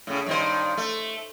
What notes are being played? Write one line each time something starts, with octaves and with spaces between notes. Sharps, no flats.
A2 C#3
G2 D#3 C5
A3